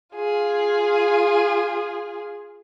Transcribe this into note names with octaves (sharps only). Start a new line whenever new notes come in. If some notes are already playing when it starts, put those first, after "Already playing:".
F4 G#4